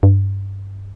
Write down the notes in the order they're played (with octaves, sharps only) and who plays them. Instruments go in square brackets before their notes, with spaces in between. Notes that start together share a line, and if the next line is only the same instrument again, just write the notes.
[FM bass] G2